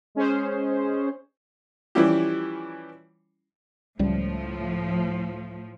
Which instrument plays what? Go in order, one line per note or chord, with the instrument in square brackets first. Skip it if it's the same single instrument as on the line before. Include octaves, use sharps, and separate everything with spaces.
[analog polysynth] G#3 C#4 G#4 C5
[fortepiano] E3 F3 G3 C#4 E4 G4
[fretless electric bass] C#2 G3 [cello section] A2 F3